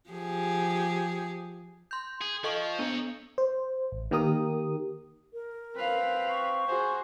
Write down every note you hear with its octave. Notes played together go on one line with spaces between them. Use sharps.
F3 G4 G#4
C6 G6
G#4
F3 A4 D#5 C#6
B3 D4 C#5 D#5
C5
A1
D#3 A#3 G4 A#4 D#6
A#4
C4 B4 F5
C#6
F#4 G#4 C5